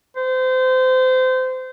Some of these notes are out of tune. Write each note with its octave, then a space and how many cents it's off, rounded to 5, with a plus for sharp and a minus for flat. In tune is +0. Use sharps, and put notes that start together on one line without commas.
C5 -25